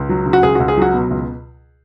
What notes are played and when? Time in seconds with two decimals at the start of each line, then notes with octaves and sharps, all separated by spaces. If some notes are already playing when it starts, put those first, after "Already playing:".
Already playing: C#2
0.09 F#3
0.26 C#3
0.33 F#4
0.43 C#2 G#4
0.55 C#2 F#4
0.68 G#4
0.77 F#3 F#4
0.94 B2
1.11 C#2